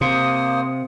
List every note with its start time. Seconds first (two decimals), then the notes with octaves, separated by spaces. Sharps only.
0.01 C3 A#3 C5 D#6